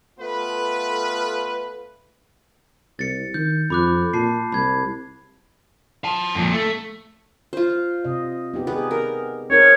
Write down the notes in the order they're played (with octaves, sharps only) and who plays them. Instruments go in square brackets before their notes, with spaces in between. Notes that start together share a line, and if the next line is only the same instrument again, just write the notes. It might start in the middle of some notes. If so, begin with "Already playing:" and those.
[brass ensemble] A3 B3 F4 A4 B4
[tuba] C2 [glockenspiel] A6 C#7
[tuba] D#3 [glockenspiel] G6
[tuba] F2 [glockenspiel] B5 D6 F#6
[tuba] A#2 [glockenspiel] A5 C7
[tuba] C2 [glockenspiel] B5 G#6
[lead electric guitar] F5 A5
F2 A#2
A3
[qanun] F4 C5
[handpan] C3 D#5
B3 D#4 G4
[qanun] B3 [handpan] D#4 G4 G#4
[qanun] A#4
[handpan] C4 D#4 A#4 [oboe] C#5